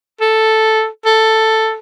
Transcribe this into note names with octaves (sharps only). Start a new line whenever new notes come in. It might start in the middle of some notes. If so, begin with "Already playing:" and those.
A4
A4